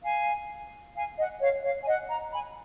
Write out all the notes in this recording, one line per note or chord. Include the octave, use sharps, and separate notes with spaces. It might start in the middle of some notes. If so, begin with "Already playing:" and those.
F5 G#5
F5 G#5
D#5 F#5
C#5 F5
C#5 F5
G#5
D#5 F#5
F#5 A#5
G#5 B5